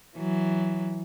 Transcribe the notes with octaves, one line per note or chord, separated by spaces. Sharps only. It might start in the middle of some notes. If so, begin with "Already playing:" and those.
E3 F#3